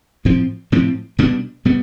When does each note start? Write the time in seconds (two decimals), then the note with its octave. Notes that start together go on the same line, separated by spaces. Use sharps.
0.25 A2 F3 C4
0.72 A2 F3 C4
1.19 B2 G3 B3 D4
1.65 B2 G3 B3